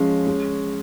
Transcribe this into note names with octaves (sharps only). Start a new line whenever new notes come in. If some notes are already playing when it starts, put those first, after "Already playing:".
Already playing: F3 G#3 C#4
G#3